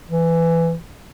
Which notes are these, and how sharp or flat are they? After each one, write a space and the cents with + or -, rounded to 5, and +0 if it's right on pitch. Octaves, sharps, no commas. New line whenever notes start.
E3 +15